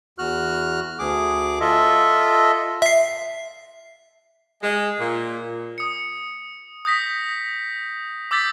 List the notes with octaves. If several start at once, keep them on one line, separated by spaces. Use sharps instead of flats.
E2 F#4 F6 F#6
D2 G#4 D6
F4 A4 D#5 E5
E5 C7
G#3
A#2
D#6 C#7
D#6 G6 A#6 B6
D6 E6 G6 A6 B6